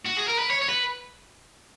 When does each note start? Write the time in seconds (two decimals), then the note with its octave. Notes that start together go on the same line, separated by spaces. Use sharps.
0.06 F#4
0.17 G#4
0.28 A#4
0.39 B4
0.51 C#5
0.62 C#5
0.69 B4